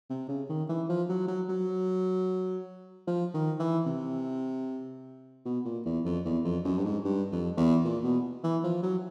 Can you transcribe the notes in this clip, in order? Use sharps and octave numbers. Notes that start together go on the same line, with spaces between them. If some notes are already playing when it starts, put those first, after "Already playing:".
C3
C#3
D#3
E3
F3
F#3
F#3
F#3
F3
D#3
E3
C3
B2
A#2
E2
F2
E2
F2
F#2
G2
G#2
G2
F2
E2
A#2
B2
E3
F3
F#3